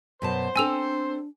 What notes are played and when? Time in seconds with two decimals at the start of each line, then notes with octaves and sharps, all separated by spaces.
0.22 F#2 B2 C5 A5 C6
0.56 C4 D4 A4 G#5 E6 F7